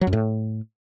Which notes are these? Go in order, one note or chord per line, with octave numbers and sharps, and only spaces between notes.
F#3
F#2
A2